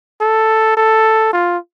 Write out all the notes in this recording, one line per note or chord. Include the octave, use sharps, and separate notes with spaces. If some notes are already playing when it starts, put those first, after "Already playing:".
A4
A4
F4